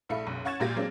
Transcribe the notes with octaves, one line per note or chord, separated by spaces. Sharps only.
A#1 A3 E4 F5 B5 C#7
F#1 B1
C#4 F#5 C#6 G#6 A6 E7
A#1 A#2 A#3 G4 A#6
F#3 G#3 A#3 C4 D4